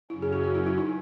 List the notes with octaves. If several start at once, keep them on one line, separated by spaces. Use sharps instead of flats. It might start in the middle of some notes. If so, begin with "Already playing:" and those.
F#2 C#3 F#3 C#4 E4
G#4
G#4
F#4
E4
E4
D#4